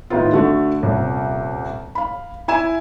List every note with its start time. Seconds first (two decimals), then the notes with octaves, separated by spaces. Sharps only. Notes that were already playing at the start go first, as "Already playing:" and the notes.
0.10 A2 D#3 B3 F4
0.33 D3 A3 F#4
0.83 D#1 C2
1.95 F5 B5
2.48 E4 G#5 E7